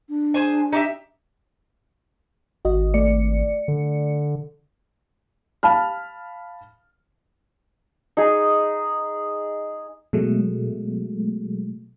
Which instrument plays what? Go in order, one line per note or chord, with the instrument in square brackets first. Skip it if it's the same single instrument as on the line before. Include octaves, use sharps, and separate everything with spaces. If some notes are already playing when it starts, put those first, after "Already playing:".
[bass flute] D4
[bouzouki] G#4 C5 G#5
D#4 G4 E5
[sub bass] G#1 [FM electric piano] F#4 D#5
[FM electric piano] A3 D5 C#7
[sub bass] D3
[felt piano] F5 A5 B5 F6
[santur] D#4 G#4
[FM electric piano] B2 F#3 G#3 A3